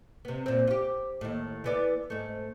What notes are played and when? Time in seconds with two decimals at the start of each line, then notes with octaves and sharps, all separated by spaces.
0.25 C3 B3
0.46 A#2 C4
0.67 F4 G4
1.21 D#2 A2
1.64 E3 B3 D5
2.10 G#2 A3